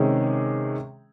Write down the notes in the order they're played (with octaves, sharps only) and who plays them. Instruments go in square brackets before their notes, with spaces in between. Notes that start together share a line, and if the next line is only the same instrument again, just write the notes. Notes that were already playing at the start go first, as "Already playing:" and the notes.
Already playing: [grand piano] C3 D#3 G#3 C#4 G#4